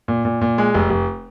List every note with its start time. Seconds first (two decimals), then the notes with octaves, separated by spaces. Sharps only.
0.08 A#2
0.25 A#2
0.41 A#2
0.58 G#3
0.74 F1
0.90 F1